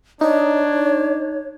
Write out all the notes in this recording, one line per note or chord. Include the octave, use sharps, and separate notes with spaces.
D4 D#4 C#5